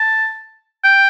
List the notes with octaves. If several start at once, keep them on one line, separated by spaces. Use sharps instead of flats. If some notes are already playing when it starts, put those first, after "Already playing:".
Already playing: A5
G5